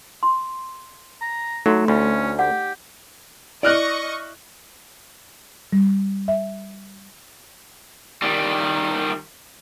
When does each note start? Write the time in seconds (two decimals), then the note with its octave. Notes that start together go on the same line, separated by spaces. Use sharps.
0.23 C6
1.21 A#5
1.66 F#3 A3 D#4 F#4
1.88 D2 C#4 B5
2.39 G4 D5 F#5
3.63 E4 D5 D#5 C#6 F6 F#6
5.73 G3
6.28 E5
8.22 D#3 G3